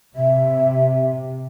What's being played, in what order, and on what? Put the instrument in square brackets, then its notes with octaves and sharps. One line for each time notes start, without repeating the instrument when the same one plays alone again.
[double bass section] C3 [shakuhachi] E5